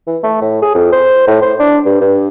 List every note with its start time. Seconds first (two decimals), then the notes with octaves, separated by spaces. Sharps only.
0.07 E3
0.23 A3
0.41 A2
0.62 G#4
0.75 F2
0.92 C5
1.27 A2
1.42 C5
1.59 D4
1.86 G2
2.01 G2